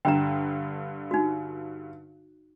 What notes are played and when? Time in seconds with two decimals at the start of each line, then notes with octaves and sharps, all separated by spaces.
0.05 G2 D3 G5 A#5
1.11 D#4 F#4